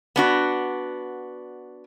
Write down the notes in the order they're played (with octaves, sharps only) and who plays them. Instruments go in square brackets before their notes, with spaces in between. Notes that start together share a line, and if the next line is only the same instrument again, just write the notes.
[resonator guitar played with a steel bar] B3 D4 F#4